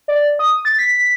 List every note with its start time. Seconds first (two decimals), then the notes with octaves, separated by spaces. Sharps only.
0.08 D5
0.39 D#6
0.65 A6
0.79 B6